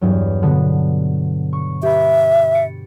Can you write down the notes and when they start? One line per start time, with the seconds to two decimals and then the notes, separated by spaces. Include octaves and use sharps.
0.01 E2 G2 F#3
0.42 B2 D3 B3
1.53 C#6
1.83 G4 B4 E5 B5
2.55 A6 C#7 D7